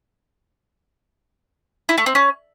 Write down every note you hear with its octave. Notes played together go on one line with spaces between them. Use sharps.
E4
A3
C4
C#4